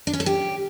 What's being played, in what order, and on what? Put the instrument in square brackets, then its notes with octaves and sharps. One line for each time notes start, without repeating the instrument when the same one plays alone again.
[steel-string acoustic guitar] D4
C#4
A4
G4